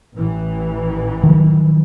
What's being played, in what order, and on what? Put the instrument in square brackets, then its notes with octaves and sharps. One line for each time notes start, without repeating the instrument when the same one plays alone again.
[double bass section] A1 E3
[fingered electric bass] D#3 F3 F#3